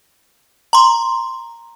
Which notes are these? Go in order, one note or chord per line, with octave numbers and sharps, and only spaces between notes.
A#5 C6